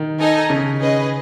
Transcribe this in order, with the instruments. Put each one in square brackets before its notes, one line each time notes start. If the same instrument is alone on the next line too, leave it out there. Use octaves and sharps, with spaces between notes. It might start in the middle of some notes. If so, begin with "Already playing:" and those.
Already playing: [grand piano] D#3
[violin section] D#4 A4 D#5 G#5
[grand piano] C#3
[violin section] C#4 G#4 B4 D#5